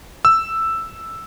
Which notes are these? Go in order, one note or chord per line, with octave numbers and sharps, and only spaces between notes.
E6